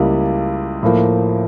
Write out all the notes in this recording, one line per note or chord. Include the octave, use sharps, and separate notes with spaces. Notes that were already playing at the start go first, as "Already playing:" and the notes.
Already playing: C#2 C#3 G3 A#3 E4
A2 F3 A#3